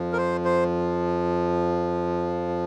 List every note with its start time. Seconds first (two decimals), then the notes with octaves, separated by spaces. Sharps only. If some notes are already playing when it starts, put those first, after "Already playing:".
Already playing: F2 F3
0.13 A#4
0.17 C5
0.45 C5